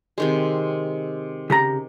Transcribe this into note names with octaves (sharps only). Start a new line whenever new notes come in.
C3 D#3 G#3
C#3 G4 A#5